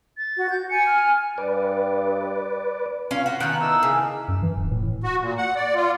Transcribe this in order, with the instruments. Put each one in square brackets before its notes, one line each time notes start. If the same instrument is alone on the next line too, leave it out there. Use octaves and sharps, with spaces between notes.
[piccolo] A6
[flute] F#4
G6
[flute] G#5 [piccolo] C#7
[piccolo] F6
[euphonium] G2 [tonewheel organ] B4 D5
[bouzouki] C#4 F5 [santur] F4 B5
[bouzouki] F#4
[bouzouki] D#3 B3 [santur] G5 A5 A#5 [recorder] F#6
[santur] A#3 D#4 E4 [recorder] E6
[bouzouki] C#3 [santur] G#5 A5 D6
[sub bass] F#2
E3
D1
A2
[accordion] F#4
A#2
F#5
D5
F4